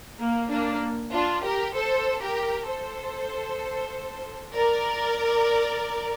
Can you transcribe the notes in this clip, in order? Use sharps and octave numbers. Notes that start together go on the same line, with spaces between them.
A#3
A#3 D4
D4 F4
G4 A#4
A4 C5
G4 A#4
A4 C5
A#4 D5